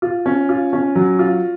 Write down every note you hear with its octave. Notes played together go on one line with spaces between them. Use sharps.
F4
C#4
F4
C#4
F#3
F4